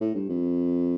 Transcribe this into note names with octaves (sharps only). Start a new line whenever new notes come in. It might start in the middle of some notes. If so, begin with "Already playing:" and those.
A2
G2
F2